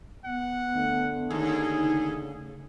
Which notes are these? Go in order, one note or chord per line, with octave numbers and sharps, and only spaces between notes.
B3 F#5
D3 A3
D#2 G#4
C#3